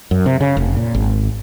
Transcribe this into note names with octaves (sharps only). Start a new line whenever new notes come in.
F#2
C3
C#3
F1
A#2
G#1